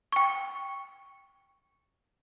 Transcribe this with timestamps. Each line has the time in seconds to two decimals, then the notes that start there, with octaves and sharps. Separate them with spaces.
0.12 G5 C#6